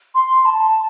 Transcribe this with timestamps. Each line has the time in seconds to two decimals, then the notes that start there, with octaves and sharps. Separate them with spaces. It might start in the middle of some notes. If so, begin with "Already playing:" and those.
0.15 C6
0.46 A5